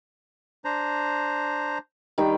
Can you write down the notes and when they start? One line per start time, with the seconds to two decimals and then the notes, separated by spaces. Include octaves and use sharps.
0.65 D4 C5 A#5
2.18 D#3 G3 G5